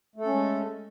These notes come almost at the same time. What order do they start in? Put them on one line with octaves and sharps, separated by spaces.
A3 A4 C#4 G#3